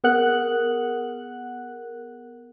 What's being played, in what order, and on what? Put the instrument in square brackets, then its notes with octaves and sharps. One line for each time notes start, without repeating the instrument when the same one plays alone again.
[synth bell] B3 G#4 A#4 F#5 F#6 F#7